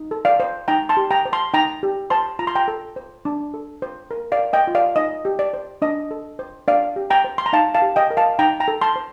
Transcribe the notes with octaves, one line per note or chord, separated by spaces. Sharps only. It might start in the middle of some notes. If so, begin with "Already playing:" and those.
Already playing: D#4
A4
D5 F5
C5
D#4 G5 A#5
A5 C6
G4
G5 A#5
C5
A5 C6
D#4 G5 A#5
G4
C5 A5 C6
F4 A#5
C6
G5 A#5
A4
C5
D4
A4
C5
A#4
D5 F5
A#4
D#5 G5
F4
D5 F5
D#4 D#5
G4
D5
C5
D4 D#5
A4
C5
D4 D5 F5
G4
G5 A#5
C5
C6
A#5
D#4 F5 A5
F5 A5
G4
D#5 G5
A#4
F5 A5
D#4 G5 A#5
G5 A#5
A4
A5 C6
C5